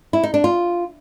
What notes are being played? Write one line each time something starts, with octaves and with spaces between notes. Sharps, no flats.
E4
D#4
D4
F4